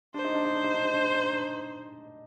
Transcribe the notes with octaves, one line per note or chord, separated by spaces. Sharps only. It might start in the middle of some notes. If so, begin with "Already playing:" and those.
D4 C5
D#4
D4
D#4
D4
D#4
D4
D#4
D4
D#4
D4
D#4
D4